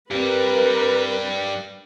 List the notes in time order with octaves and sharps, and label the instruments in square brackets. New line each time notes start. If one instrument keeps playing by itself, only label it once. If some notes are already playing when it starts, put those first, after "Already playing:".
[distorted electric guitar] G2 G3 [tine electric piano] C4 G4 [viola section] A#4 B4